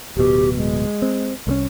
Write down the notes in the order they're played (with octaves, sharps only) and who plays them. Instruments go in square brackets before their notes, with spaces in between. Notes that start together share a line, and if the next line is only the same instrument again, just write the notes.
[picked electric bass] D1 B2 [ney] G4
[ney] G#3
[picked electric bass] C4
C2 A3 C#4